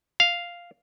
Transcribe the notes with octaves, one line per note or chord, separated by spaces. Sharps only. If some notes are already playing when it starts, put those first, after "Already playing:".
F5